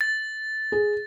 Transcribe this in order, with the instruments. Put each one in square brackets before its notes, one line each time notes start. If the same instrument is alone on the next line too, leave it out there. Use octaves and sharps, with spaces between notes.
[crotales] A6
[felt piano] G#4